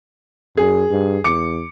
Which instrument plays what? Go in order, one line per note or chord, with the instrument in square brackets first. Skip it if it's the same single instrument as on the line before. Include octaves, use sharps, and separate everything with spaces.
[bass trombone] F#2 [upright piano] G#4
[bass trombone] G2
[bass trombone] E2 [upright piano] D6 C#7